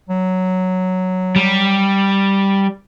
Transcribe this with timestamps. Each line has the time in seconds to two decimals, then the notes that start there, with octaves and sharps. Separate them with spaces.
0.10 F#3
1.36 G3